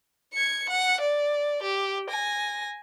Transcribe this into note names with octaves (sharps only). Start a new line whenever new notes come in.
G#6 C#7
F#5
D5
G4
G#5 A#6